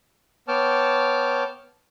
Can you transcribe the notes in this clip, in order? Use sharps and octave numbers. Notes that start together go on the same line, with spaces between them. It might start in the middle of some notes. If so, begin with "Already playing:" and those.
B3 C#5 G5 A5 D6 F6